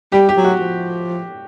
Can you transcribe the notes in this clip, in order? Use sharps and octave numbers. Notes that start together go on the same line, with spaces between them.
G3 G4
G4
F#3
F#4
F3